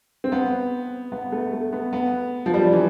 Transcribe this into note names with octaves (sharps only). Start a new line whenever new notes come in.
C4
B3
B3
A3
A3
B3
B3
F3
G3
F3
E3